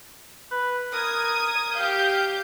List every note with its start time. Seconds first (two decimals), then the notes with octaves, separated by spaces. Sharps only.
0.51 B4
0.93 A#4 D#6 G#6
1.75 G4 F5 G6